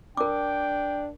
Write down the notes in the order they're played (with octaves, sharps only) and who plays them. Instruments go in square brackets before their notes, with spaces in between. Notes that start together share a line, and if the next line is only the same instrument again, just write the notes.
[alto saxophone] D4 [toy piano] A#4 D6 [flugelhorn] G5